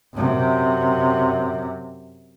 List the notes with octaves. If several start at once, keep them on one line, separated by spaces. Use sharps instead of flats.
F#2 C3